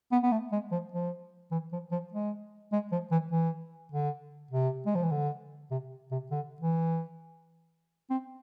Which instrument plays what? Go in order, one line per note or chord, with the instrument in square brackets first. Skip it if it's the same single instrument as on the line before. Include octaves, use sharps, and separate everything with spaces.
[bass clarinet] B3
B3
A3
G#3
F3
F3
E3
F3
F3
G#3
G#3
F3
E3
E3
D3
C3
G#3
F3
E3
D3
C3
C3
D3
E3
C4